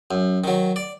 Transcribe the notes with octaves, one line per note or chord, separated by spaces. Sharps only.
F#2
D#3 F#3
D5